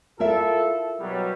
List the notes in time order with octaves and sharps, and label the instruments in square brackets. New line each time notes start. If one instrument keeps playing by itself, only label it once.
[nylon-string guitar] E4 A#4 E5 [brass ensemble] F4 A4
[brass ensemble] B2 F#3 G3